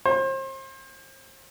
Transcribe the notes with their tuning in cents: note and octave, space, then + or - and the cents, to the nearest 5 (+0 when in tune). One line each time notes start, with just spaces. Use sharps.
C5 +35